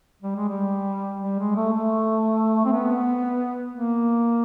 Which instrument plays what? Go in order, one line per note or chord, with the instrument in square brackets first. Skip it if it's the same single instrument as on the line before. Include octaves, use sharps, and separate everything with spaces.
[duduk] G3
G#3
G3
G3
G#3
A3
A3
C4
B3
A#3